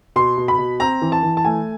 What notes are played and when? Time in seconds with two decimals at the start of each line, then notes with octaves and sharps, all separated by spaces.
0.16 B2 C6
0.38 B2
0.48 B5
0.58 B2
0.80 C4 A#5
1.02 E3
1.12 A5
1.23 E3
1.37 A5
1.45 A3 G#5